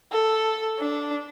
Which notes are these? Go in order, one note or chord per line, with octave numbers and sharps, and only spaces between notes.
A4
D4